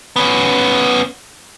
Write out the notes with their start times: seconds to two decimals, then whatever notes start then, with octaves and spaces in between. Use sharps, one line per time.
0.16 B3 C#4